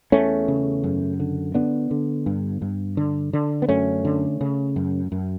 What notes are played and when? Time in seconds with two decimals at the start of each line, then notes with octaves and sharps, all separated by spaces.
0.12 E2 A3 C#4
0.48 C#3
0.84 F#2
1.20 D3
1.54 D3 B3 D4
1.91 D3
2.26 G2
2.62 G2
2.97 D3
3.33 D3
3.62 B3
3.69 F#2 A3 C#4
4.05 D3
4.41 C#3
4.76 F#2
5.12 F#2